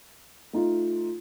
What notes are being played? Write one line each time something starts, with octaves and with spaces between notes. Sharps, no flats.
A3 D#4 F4